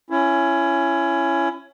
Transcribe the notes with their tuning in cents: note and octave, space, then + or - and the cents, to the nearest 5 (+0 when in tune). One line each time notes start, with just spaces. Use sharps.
C#4 +0 E4 +25